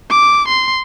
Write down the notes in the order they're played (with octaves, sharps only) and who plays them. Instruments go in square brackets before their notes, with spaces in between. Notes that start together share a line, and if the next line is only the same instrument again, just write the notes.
[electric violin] D6
C6